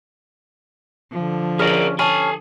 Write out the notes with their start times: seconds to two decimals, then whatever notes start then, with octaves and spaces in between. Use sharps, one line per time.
1.12 D3 F3
1.59 C#4 G#4 A#4 D5
1.99 C#4 A4 G#5 A5